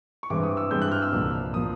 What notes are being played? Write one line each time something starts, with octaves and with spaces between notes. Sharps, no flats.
C#6
G2 E3 G#3 C4 D6
D#6
E6
G2 E3 G#3 C4 G6
F#6
F6
E6
C2 A#2 F3 A#3
A#2 F3 A#3 D#6